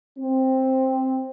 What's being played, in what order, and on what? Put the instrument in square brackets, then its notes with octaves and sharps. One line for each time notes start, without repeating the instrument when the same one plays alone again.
[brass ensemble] C4